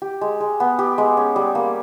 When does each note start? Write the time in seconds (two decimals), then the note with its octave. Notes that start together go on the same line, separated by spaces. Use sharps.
0.02 G4
0.21 G#3
0.40 G#3
0.60 B3
0.79 G4
0.98 G#3
1.17 C#4
1.36 G3
1.55 A#3